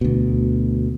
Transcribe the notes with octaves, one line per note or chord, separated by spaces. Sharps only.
D2 B2